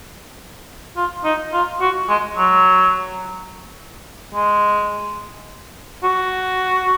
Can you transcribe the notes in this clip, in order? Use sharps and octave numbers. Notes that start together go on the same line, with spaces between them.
F4
D#4
F4
F#4
G#3
F#3
G#3
F#4